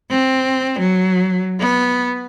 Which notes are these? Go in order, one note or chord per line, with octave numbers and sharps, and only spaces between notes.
C4
F#3
B3